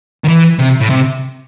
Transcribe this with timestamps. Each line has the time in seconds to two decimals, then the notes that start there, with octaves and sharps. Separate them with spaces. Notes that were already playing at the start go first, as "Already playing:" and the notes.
0.24 D#3
0.28 E3
0.59 C3
0.80 A2
0.90 C3